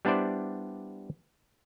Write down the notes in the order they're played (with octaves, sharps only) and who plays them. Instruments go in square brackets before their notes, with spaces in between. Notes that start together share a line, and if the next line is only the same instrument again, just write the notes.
[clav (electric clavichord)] G3 B3 D4 E4 C5 D5